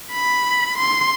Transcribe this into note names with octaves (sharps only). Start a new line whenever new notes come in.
B5
C6